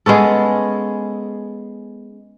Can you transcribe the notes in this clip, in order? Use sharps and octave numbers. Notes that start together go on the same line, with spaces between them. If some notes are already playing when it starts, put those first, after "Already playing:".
G#3 B3 C#4 A4